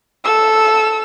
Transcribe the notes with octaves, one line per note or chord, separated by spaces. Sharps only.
A4 E6